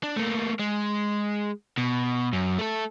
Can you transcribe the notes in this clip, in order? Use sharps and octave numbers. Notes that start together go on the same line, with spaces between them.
D4
A3 A#3
G#3
B2
F#2
A3 A4